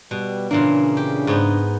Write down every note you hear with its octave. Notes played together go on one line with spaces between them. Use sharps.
B2 G3
A#2 C#3 E3 A#3 D4
G4
G#2 B3 D#4